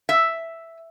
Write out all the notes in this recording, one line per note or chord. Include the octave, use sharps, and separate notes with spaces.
E5